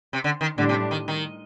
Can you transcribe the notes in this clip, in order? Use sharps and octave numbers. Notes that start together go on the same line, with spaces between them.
C3
D3
D#3
A2 D3 G3 D4 G4
C3
D#3
D#3